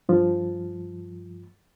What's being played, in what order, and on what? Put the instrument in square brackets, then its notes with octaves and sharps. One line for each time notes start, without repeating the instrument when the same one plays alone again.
[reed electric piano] G2 F3